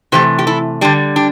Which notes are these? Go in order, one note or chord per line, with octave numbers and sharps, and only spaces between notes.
C3 E3 A3 G4 C5
G4
E4 A4
D3 G3 D4 G4
D4 G4